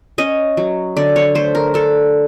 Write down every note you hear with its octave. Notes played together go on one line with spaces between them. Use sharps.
C#4 D#5
F#3
D3 D5
C#5
A3 C5
A#4
D4 A4